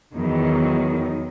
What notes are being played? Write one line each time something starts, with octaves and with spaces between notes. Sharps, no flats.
E2 D#3 F#3